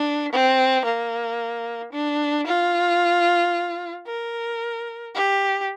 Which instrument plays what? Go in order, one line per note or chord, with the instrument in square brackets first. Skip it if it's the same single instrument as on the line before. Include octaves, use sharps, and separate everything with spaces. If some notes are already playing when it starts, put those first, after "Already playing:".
Already playing: [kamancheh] D4
C4
A#3
D4
F4
A#4
G4